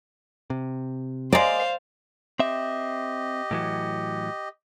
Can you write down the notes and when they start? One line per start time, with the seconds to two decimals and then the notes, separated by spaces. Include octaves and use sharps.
0.50 C3
1.32 G#3 A#3 C5 D5 F5
2.39 C4 G4 D#5 E5
3.51 A2 E3 F#3